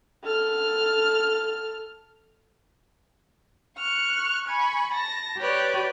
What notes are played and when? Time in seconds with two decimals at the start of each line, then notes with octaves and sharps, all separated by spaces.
0.23 A4 F6
3.78 C#6 F6 F#6
4.46 G#5 B5 C#6
4.91 A5 A#6
5.38 G4 B4 C#5 D5